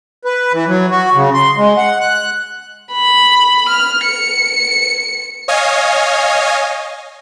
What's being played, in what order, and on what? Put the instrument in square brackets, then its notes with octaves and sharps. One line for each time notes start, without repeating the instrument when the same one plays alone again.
[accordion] B4
E3
F#3
F#4
C#3
C6
G#3
F#5
F#6
[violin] B5
F6
C#7
[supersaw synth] C#5 D#5 F5 G#5